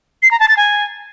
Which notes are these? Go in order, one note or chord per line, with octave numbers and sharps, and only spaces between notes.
C7
A#5
A5
A6
G#5